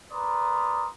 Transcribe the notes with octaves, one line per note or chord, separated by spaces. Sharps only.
A#4 B4 D5 A#5 C6 D#6